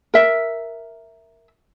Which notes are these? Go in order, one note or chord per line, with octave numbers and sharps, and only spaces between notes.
A#4 E5